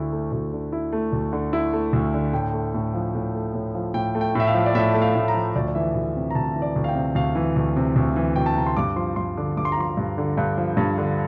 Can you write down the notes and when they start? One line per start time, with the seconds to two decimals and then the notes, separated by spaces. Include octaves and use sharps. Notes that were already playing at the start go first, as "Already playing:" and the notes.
Already playing: D2 D3 E4
0.13 A3
0.32 D2
0.53 D3
0.73 E4
0.92 A3
1.13 D2
1.33 D3
1.53 E4
1.73 A3
1.93 D2
2.14 D3
2.33 A2 G5
2.53 A3
2.74 A2
2.94 F3
3.15 A2
3.35 A3
3.54 A2
3.75 F3
3.94 A2 G5
4.15 A3
4.21 G5
4.35 A2 E5
4.47 F5
4.55 F3
4.66 D5
4.75 A2 E5
4.94 A3
5.02 F5
5.15 A2
5.28 A#5
5.34 F3
5.56 D2 D5
5.67 D5
5.75 E3 E5
5.95 D2
6.16 C3
6.31 A#5
6.35 D2 A5
6.56 E3
6.62 D5
6.76 D2
6.84 F5
6.88 G5
6.95 C3
7.15 D2 F5
7.35 E3
7.56 D2
7.76 C3
7.96 D2
8.16 E3
8.36 D2 G5
8.46 A5
8.56 C3 A#5
8.67 C6
8.77 G2 D6
8.96 F3 C6
9.16 G2 C6
9.37 D3 D6
9.57 G2 D6
9.65 C6
9.72 A#5
9.78 F3 C6
9.97 G2
10.18 D3
10.38 G2
10.58 F3
10.77 G2
10.98 D3